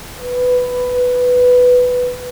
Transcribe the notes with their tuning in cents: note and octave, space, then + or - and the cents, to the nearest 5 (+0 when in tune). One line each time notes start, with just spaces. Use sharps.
B4 +5